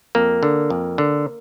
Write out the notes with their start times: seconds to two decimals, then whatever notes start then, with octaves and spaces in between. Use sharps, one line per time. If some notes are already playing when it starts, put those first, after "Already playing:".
0.15 F2 A#3
0.43 D3
0.70 F2
0.98 D3